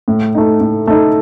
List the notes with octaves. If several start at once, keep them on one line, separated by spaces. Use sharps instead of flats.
A2
A3 D#4
A2
A3 D#4